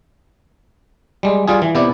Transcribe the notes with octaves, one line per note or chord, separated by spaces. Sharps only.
G3 G#3
G3 F4 G#4
E3
C3 B3 E4 D5